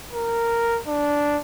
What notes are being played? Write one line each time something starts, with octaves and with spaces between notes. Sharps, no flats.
A#4
D4